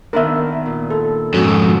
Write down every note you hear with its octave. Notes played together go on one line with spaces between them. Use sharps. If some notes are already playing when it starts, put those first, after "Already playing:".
D#3 B3 D4 A#4 E5
A#2
A4
F2 G#2 C#4 F#4 A4 F#5